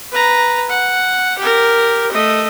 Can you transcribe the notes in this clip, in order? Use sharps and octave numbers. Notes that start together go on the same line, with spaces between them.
B4 A#5
F#5
G4 A#4
A3 D#5